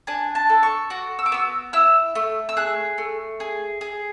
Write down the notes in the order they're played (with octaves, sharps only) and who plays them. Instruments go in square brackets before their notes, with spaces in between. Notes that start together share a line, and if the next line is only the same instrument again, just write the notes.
[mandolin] D4 G#5
A5
A4
C#6
F#4 D6
E6
D6
B3 E6
E4 E6
A3
E6
G#4 F#6
A3
G#4
G#4